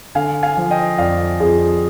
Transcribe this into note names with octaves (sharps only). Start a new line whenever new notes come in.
D3 F5 G#5
F5 G#5
F3
D#5 G5
F2 D5 F5
F2 F4 G#4